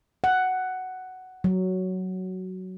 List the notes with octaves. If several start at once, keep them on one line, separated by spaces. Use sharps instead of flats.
F#5
F#3